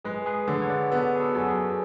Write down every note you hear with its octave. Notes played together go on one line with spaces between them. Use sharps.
G#3 G#4 B4
G#4 B4
D3 A4 C#5
C#5
B4 D5
B3 F#4 A4
G#4
F#4 A4
F#2 A4
G#4 B4